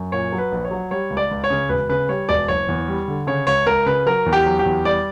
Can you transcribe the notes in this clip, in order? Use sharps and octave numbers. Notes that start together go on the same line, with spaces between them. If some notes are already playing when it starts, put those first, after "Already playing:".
Already playing: F#2
A#2 C#5
F#3
B4
A#1
C#5
F#3
G3 C#5
C#2
D5
C#2
C#5
C#3
E1 B4
C#3 B4
G3 C#5
E1 D5
F#1 C#5
E2
G3
D3
C#3 C#5
C#2 C#5
C#2 A#4
C#3 B4
F#3 A#4
E2
G4
F#3
G4
E2
G3 D5